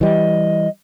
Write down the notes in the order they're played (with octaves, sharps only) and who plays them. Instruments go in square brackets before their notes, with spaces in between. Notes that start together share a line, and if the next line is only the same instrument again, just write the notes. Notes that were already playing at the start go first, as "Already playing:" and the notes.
[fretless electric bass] E3 G3 [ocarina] D#5